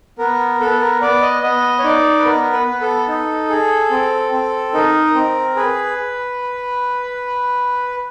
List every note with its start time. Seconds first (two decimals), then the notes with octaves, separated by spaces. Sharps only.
0.19 B3 A#4
0.60 B3 A4
0.81 A#4
1.01 B3 D5
1.22 D#5
1.43 B3 D#5
1.79 C#5
1.84 D#4 D5
2.19 B4
2.25 B3 A#4
2.53 B4
2.67 B3
2.81 A4
3.08 D#4
3.50 G#4
3.90 C4
4.32 C4
4.74 D#4 A#4
5.15 C4
5.56 G#4 B4